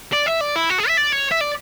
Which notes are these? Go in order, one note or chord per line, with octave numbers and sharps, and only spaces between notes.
D5
E5
D5
E4
F#4
G#4
E5
D5
C#5
E5
D5